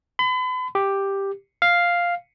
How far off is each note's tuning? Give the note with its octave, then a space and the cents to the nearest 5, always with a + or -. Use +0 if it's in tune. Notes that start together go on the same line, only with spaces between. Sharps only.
B5 +40
G4 +5
F5 +0